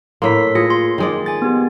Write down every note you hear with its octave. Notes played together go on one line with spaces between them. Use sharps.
A2 A#3 C6 E6 B6
F4 G#4 A#6 C#7
C6
D#3 G#3 D5
G#5 A6
B3 G4